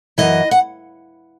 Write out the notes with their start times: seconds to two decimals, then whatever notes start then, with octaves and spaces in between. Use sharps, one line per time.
0.18 F#2 E3 D#5
0.51 F#5